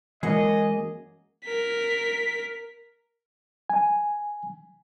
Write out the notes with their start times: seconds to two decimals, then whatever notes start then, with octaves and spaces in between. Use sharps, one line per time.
0.23 F#2 E3 G#3 A#3 G#4 D#5 F#5
1.45 A#4 B6
3.70 G#5